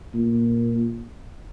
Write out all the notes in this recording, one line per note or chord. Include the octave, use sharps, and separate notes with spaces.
A#2